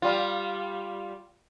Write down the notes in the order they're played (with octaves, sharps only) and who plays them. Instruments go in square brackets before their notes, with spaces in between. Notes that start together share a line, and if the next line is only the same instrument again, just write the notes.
[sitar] G3 F4